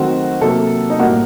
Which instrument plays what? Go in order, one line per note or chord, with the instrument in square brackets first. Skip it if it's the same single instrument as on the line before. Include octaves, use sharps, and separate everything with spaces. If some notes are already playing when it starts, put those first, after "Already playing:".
Already playing: [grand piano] D#3 F#3 A3 C4 F#4
C3 F#3 A#3 A4
D#4
A2 G3 A#3 F#4